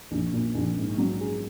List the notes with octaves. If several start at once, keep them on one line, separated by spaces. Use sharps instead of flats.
A#1
A#2
A#1
G#2
F#3
G#4